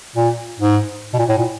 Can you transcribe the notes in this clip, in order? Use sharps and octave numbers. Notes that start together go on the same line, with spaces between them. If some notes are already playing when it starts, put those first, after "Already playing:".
A#2
G#2
B2
A#2
A2
A#2